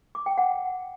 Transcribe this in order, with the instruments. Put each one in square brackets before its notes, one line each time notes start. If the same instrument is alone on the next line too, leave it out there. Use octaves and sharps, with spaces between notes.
[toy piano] D6
G5
F#5